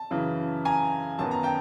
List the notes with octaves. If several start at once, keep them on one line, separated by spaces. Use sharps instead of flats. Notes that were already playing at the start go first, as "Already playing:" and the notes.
Already playing: A5
F#2 C#3 E3
G#5 A#5
F#2 D#3 F#3 B3 A5
A#5
G5 A5